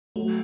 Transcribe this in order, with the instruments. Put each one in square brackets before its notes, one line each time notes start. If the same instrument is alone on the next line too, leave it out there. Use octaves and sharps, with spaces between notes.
[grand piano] F#3 [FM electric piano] A3